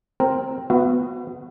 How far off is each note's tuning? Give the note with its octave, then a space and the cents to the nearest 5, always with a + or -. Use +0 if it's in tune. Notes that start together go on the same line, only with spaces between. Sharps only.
C4 +0 A#4 +0
B3 +15 F#4 -15 E5 +45